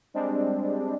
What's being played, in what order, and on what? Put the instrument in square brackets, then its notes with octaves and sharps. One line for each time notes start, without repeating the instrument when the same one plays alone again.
[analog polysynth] G3 G#3 C4 D4